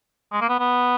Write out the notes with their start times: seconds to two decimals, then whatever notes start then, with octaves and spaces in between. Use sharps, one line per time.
0.32 G#3
0.41 A#3
0.49 B3
0.60 B3